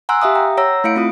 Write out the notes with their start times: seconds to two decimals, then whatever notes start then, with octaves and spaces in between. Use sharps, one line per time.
0.09 F#5 G#5 A#5 C6 E6 F#6
0.22 G4 E5 F5 D#6
0.35 G5 A#5
0.57 C#5 F#5 A#5 E6 A#6
0.84 A3 E4 F5 C#7 D7
0.96 A3 C4 F4 D#6